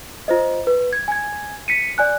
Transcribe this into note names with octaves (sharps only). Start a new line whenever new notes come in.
F4 C5 D#5
B4
G#6
G#5 G#6
B6 C#7 D#7
D5 G#5 F#6